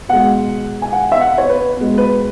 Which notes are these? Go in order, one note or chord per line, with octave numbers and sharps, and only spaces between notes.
B2 G#3 F#5
G#5
F#5
E5
F#5
C#5
B4
B2 G#3
B4